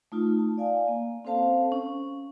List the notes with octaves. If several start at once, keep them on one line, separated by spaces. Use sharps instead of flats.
A3 D#4 F4
A5
D5 F5 G#5
A#3
C4 C#4 A4 C5 F5 A5
C#4